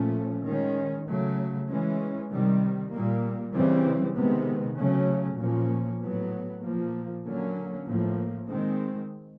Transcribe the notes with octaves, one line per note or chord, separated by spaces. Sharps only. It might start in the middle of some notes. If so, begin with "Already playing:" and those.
Already playing: A#2 F3 A3 C#4
D#3 G#3 C#4
C#3 F#3 A3
E3 G#3 C#4
C3 D#3 G3
A#2 G3 A#3
C#3 E3 G3 C4
C3 D#3 G#3 B3
C#3 F#3 A3 C#4
A#2 F3 A#3 C#4
A2 F#3 B3
A#2 F3 A#3
D3 F#3 A#3 C#4
A2 F3 A#3
D#3 G#3 C4